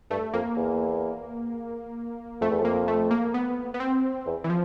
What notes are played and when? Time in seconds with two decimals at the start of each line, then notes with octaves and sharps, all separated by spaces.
0.11 G2 A3
0.33 F2 A#3
0.56 E2
2.41 F2 A3
2.51 E2
2.62 F2 A#3
2.88 A3
3.11 A#3
3.34 B3
3.74 B3
3.80 C4
4.26 E2
4.44 E3
4.50 F3